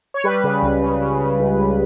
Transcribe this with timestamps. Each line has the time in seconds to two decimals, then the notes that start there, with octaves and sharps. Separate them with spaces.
0.14 C#5
0.24 G3 B4
0.44 C#3
0.63 C#2
0.82 C#3
1.01 C#3
1.20 C#3
1.39 C#2
1.58 C#2